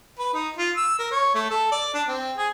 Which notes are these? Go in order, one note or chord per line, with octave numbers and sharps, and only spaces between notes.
B4
D#4
F4
E6
A#4
C#5
A3
A4
D5
D4
C4
G#4